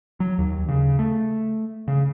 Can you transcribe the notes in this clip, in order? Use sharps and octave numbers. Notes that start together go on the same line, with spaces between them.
F#3
D#2
C#3
A3
C#3